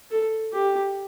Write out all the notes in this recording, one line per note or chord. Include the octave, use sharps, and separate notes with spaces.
A4
G4